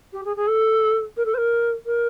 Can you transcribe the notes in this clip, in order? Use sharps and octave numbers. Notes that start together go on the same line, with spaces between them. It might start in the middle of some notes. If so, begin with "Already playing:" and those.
G4
G#4
G#4
A4
A#4
A4
C5
A#4
A#4